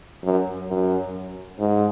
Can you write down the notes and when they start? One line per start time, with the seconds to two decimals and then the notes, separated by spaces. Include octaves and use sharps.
0.24 F#2
0.69 F#2
1.59 G#2